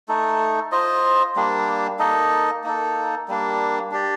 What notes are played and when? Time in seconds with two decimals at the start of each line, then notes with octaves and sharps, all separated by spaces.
0.08 A3 D#4 A4
0.72 F4 C5 D#5
1.36 G3 A#3 D4
1.99 A#3 D#4 A4 D#5
2.64 A#3 D#4 A4
3.28 G3 A#3 D4
3.92 D4 G4 D5